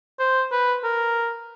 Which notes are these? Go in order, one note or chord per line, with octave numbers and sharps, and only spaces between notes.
C5
B4
A#4